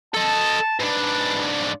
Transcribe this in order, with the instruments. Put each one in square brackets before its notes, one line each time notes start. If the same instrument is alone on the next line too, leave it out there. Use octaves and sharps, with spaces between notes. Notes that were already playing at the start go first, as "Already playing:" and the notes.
[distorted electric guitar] A4 D#5 [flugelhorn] A5
[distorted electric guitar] G#2 D4 [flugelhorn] B4